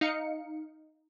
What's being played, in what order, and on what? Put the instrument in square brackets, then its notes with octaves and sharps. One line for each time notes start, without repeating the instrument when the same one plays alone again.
[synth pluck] D#4 F5 C#7